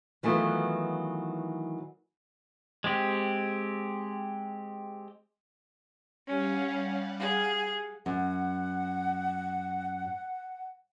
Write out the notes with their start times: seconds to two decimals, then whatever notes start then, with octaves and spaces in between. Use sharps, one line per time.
0.23 D#3 E3 F#3 A3 B3 F4
2.84 G#3 C4 G4
6.28 G3 C#4 F5 F#5
7.18 G#4
8.06 F#2 F#5